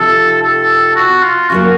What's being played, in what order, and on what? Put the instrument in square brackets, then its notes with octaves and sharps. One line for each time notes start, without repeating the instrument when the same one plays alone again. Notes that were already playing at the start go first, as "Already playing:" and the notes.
Already playing: [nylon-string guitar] C3 F3 D#4 [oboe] A4
[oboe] A4
F#4
F4
[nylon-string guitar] C#3 F#3 A#3 [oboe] F#4